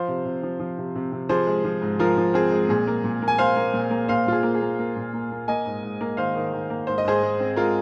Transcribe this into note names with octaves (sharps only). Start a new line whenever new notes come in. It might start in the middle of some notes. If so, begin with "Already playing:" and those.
Already playing: F3 C5 F5
C3
C3
F3
F3
C3
C3
C3
F3 G#4 C5
G#3
F3
G#2
F3 F4 A#4
F3
C4 G#4
G#3
A#2 G#4
A#3
A#2
A#3
G#5
A#3 C5 F5
A#3
A#2
A#3
A#2 C5 F5
A#2 F4
G#4
A#3
G#4
A#3
A#3
A#2
A#3
A#3
A#3 D#5 G#5
G#2
G#2
A#3
D#3 C5 F5
D#3
D#3
A#3
G#2 C5
D#5
G#2 G#4 C5
G#3
C4
G#3 F4 A#4